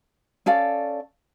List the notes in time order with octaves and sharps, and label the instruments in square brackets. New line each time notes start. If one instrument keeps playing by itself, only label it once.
[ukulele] C#4 A4 D5 F5